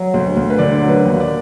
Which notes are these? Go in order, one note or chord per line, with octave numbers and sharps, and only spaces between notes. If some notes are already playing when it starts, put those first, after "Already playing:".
Already playing: F#3
D2
D2
B4
D3 D5
F#3
B4
D#2
D5